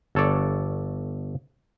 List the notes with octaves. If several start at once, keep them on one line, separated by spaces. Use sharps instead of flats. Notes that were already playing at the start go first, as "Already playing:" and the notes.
G1 A4 C#5 D5